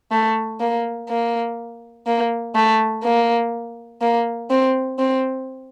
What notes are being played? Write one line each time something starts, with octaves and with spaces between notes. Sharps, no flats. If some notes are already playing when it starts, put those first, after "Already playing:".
A3
A#3
A#3
A#3
A3
A#3
A#3
C4
C4